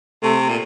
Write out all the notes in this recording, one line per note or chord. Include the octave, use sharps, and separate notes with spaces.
C3 A3
A#2